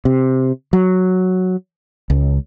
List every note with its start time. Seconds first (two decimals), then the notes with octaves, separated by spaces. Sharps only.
0.05 C3
0.73 F#3
2.10 C#2